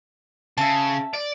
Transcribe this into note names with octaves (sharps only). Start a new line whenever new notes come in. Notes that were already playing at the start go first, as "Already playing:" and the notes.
C#3 E5 A5
D5